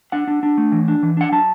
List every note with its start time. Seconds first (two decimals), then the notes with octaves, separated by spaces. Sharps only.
0.12 D4 F#5
0.27 D4
0.43 D4
0.58 A3
0.72 E3
0.88 D4
1.03 E3
1.17 D4 F#5
1.32 F#3 A5